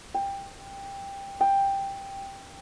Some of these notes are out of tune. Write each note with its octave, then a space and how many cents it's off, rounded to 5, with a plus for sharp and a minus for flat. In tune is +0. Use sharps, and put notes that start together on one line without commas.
G5 +15
G5 +5